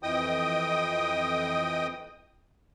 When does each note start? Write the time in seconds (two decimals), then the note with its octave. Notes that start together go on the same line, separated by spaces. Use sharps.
0.03 F2 E3 D#5 G5 D#6